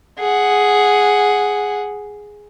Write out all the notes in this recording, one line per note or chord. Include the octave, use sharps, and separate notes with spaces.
G#4 F#5